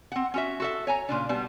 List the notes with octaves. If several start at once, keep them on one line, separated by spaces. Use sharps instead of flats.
C4 F#5
C#4 F#4 E5
F#4 A4 E5
C#5 G#5 A#5
A#2 C#3 D4
B2 G3 B3 A5